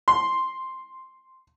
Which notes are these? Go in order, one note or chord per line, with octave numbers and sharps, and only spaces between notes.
C6